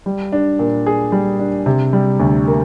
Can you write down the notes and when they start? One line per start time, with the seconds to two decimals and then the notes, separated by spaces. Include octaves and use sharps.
0.06 G3
0.32 D4
0.59 A#2
0.86 G#4
1.12 G3
1.39 D4
1.66 C3
1.93 G3
2.20 D2
2.48 A#3